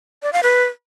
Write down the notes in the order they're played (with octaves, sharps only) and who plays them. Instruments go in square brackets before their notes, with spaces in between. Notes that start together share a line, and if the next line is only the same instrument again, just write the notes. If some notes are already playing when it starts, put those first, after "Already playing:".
[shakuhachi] D5
F5
B4